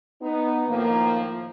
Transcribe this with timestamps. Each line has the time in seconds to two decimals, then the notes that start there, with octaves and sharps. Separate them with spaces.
0.22 B3 D#4
0.69 A2 D#3 F3 A#3